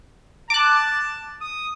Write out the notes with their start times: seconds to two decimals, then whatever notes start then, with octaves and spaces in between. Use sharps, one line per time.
0.50 A5 D6 F#6
1.41 D#6